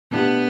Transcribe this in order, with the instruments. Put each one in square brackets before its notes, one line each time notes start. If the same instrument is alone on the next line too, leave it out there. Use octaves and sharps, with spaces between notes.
[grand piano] B2 A3 D4 G4 [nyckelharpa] B3